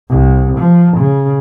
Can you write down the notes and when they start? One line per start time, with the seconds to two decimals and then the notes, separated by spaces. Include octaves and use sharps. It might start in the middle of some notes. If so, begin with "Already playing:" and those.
0.11 C2
0.59 F3
0.97 C#3